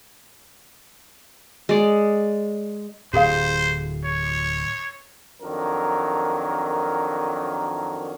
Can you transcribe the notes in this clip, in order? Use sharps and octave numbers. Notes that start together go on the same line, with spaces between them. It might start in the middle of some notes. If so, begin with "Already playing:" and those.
G#3 D5
D1 A2 G4 G#4 C5 F5
C#5
F2 D#3 F#3 D4 A#4